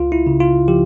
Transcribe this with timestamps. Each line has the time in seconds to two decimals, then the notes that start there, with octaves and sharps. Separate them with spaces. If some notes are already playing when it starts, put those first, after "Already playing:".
Already playing: C#2 F4
0.12 E4
0.27 C#3
0.40 F4
0.68 F3 G4